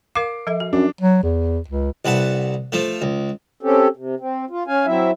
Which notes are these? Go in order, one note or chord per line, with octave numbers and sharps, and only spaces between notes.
A#4 F5 D6 C7
F3 A4 E5
F#4
F#2 D4
F#3
E2
C#2
C2 B4 F#5 A5
F3 A3
C#2
C4 C#4 G4 A4
C3
C4
F4
C#4 F5 G#5
F#3 C4 E4 E5